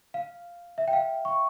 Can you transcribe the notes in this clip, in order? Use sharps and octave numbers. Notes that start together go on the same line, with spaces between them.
F5
E5
G5
F5
C#6